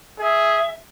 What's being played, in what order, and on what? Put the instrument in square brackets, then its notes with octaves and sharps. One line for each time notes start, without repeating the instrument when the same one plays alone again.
[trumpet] G#4 [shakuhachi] E5